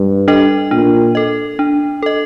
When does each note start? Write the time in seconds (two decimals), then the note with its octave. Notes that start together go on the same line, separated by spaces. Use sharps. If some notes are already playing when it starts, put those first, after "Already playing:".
Already playing: G2
0.28 D4 A4 D#5
0.71 A#2 D4
1.15 A4 D#5
1.59 D4
2.03 A4 D#5